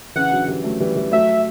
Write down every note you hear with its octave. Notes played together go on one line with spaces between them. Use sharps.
C#3 E3 F#5
D3 F#3
E3 G3
F#3 A3
E3 G3
E3 G3
F#3 A3 E5